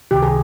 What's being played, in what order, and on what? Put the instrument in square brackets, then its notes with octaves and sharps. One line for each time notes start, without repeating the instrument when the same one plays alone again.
[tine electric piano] C#2 C3 D#3 [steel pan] G4
[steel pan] G#4